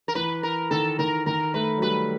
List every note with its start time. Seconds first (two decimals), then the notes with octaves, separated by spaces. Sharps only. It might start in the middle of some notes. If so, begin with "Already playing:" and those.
0.08 A#4
0.15 E3 B4
0.43 A#4
0.71 D#3 A4
0.99 D#3 A#4
1.26 D#3 A#4
1.54 A3 B4
1.78 F#3
1.82 G3 B4